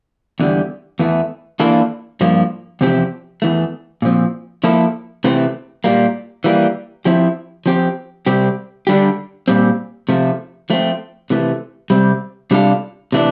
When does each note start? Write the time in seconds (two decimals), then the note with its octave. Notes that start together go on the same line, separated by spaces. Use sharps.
0.40 E2 D3 G3
0.99 E2 E3 A3
1.60 E3 A#3 D4 F4 A4
2.21 G2 F3 A#3
2.81 E2 C3 F3 C4 G4
3.42 E2 E3 A3
4.02 A#2 F3 C4
4.64 F3 A#3 E4 A4
5.24 C3 E3 A3 C4
5.84 A#2 G3 A#3
6.44 E3 G3 A#3
7.05 F3 C4 E4 G4
7.66 F3 C4 G4
8.26 C3 G3 C4 G4
8.87 D3 G3 D4 G4
9.48 A#2 G3 C4
10.09 C3 F3 A3
10.70 F3 A3 C4
11.30 C3 E3 A3
11.90 C3 G3 C4
12.51 C3 G3 D4 F4 A4
13.12 C3 E3 A3 D4